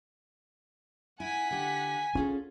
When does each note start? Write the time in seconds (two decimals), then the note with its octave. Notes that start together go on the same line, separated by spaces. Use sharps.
1.20 E4 F#5 G#5 B6
1.51 D3 G4 G#5
2.15 C#4 F4 G#4 A4